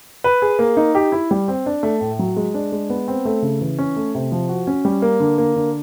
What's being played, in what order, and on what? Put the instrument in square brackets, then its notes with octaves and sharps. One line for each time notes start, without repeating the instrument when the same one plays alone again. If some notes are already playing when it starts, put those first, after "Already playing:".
[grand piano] B4
G#4
A#3
D#4
G4
E4
G3
C4
D4
A3
A2
F#3
G#3
D4
G#3
B3
C4
A3
C#3
E3
C#4
A3
C3
F3
F#4
C#4
G3
A#3
D3
A#3
D3